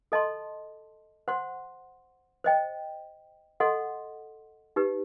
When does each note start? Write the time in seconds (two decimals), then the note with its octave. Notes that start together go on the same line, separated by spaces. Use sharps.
0.12 A4 D#5 A5 C6
1.28 C5 F#5 C6
2.44 C5 D#5 G5
3.60 A4 D#5 F#5 C6
4.76 D#4 G4 B4